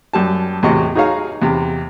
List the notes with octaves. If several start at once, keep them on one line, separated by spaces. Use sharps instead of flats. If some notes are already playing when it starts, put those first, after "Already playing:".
F#2 G3 A5
E2 A2 C3 F#4 D#5 C#6
D#4 F#4 G#4 C#5 F5 A#5
E2 C3